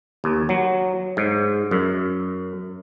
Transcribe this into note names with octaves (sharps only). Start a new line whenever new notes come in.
D#2
F#3
G#2
F#2